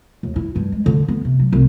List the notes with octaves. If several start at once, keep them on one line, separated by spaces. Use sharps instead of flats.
D#2
E4
G2
G#3
D3
B3
C3
F#3
C2